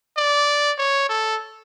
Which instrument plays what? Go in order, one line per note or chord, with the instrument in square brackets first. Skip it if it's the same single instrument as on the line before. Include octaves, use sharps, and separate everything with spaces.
[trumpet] D5
C#5
A4